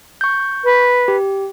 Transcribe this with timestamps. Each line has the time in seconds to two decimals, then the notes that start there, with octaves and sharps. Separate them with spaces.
0.21 C#6 G6
0.64 B4
1.08 G4